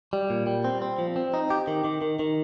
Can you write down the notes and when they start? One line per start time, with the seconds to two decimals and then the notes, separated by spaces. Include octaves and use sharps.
0.13 G3
0.30 A#2
0.47 G3
0.64 C4
0.82 C4
0.99 F3
1.16 C4
1.34 D#4
1.50 G4
1.68 D#3
1.85 D#3
2.02 D#3
2.19 D#3